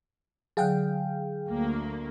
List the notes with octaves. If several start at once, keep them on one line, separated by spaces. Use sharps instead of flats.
D3 F#3 G#4 F5 G5
D2 A#3